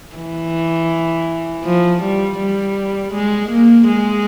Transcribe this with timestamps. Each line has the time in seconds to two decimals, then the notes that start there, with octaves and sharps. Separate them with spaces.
0.16 E3
1.65 F3
2.02 G3
2.39 G3
3.14 G#3
3.51 A#3
3.88 G#3